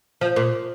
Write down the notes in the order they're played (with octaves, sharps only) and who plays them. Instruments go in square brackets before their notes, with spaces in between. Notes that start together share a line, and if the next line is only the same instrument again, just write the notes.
[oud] F3
A#2